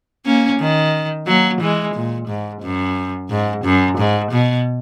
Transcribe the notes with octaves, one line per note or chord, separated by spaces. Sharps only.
A#3 C#4
D#3
F#3 A#3
E3 G#3
A#2
G#2
F#2
G#2
F#2
G#2
B2